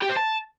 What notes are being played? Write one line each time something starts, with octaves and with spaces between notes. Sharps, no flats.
G4
C5
A5